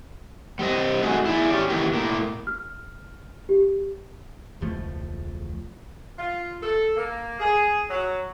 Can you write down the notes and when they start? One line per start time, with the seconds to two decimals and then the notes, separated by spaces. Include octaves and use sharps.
0.59 G3 C4 D#5
1.03 A3 D#4 F#4 G#4
1.25 E4 G#4 D5
1.52 C#4 G4
1.69 D#3 E3 A#3 E4 G4
1.93 A2 A#3
2.47 F6
3.49 G4
4.61 E1 C#2 F3 A3
6.17 F4
6.62 A4
6.97 A#3
7.39 G#4
7.89 F#3